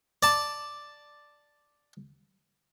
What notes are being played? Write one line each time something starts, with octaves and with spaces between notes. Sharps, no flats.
D5 A5